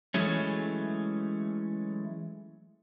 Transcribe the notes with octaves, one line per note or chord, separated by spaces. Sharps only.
E3 F#3 G#3 A3 C#4